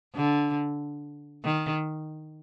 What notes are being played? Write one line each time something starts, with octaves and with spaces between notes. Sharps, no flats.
D3
D#3